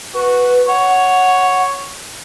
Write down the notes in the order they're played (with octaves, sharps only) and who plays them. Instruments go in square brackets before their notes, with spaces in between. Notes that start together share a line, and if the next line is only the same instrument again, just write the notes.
[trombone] F#4 [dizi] B4
[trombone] C#5 [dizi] F#5